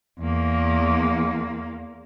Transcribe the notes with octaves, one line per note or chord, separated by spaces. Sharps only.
E2 A#3